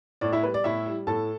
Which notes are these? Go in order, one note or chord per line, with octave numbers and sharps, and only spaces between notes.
A2 D5
E4 E5
G3 B4
D5
A2 E4 E5
G3
A2 A4 A5